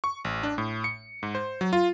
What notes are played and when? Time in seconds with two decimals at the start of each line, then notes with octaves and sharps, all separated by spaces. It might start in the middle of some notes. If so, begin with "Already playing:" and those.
0.04 C#6
0.25 A1
0.43 D4
0.58 A2
0.84 C#7
1.23 G#2
1.35 C5
1.61 F#3
1.73 F4